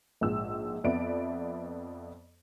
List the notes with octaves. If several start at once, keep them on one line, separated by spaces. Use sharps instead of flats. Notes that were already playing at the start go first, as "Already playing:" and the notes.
A#1 G#2 E6
F2 B3 D5 E5 D7